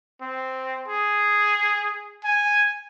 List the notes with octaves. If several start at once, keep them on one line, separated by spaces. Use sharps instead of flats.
C4
G#4
G#5